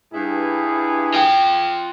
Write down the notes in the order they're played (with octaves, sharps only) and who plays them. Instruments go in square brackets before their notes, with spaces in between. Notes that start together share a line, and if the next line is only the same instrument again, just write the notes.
[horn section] G2 E4 G#4
[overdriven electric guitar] F4 G5